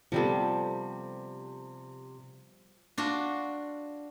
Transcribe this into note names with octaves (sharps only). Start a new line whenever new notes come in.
C3 F3 G3 B3 A4
D4 F4 F#4